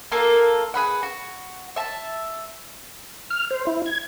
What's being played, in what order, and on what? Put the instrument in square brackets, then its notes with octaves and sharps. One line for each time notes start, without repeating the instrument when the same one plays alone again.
[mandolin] A#3 F4 A4 A#4
G#4 B4 F#5
F#4
E5 A5
[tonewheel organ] F6
C5
E4
G#6